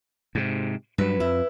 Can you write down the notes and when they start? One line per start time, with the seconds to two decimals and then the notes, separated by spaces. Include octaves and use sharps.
0.35 G#2 C3
0.98 G2 F#3 B4
1.20 F2 E4